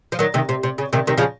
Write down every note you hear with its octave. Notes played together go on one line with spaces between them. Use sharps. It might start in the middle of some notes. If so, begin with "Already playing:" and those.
F3
D#3 F#3
C3 D#3
C3
C3
C#3
C3 D#3
C3 D#3
C#3 F3